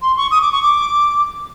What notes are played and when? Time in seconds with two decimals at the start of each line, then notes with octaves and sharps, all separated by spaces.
0.02 C6
0.17 C#6
0.31 D#6
0.42 D6
0.52 C#6
0.63 D6